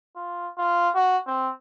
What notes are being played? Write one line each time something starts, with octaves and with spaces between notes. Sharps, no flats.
F4
F4
F#4
C4